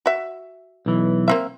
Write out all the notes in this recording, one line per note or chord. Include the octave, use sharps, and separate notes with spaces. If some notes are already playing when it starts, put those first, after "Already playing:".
F#4 E5
B1 E3
A#3 C4 E5